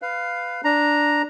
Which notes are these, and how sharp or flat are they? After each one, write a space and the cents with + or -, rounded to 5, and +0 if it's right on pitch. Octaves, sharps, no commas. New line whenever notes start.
B4 +15 F5 +0
D4 +0 A#5 +0